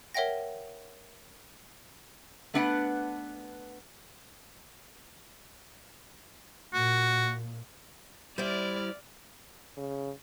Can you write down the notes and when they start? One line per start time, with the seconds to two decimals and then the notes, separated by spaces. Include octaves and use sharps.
0.14 A#4 C#5 E5 F#5 G5 A#6
2.54 A3 B3 D4 B4 F#5
6.74 A#2 F#4
8.38 G3 E4 C5 D5 F6
9.77 C#3